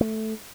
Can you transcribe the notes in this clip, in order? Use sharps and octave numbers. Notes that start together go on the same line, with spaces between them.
A3